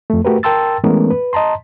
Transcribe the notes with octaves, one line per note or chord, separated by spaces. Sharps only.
F2 A3
A3 F#4 G4 A#4 B4
A#4 G5 A5 C6 E6 A6
E3 G#3 A3 B3 C#4 A#4
B4
D#5 A5 A#5 C6